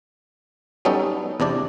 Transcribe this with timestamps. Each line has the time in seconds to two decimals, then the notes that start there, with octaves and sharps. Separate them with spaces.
0.85 F#3 G3 B3 C#4 D#4 A4
1.40 E2 C3 D4 D5